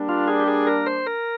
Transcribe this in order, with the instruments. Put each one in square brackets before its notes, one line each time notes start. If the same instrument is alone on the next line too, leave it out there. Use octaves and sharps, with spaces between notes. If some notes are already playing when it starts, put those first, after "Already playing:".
Already playing: [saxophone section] G3 A#3 D4
[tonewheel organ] F4
G#4
G4
G#4
A#4
C5
A#4